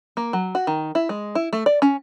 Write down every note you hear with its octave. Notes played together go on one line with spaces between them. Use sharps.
A#3
F#3
F#4
D#3
E4
G#3
E4
A3
D5
C#4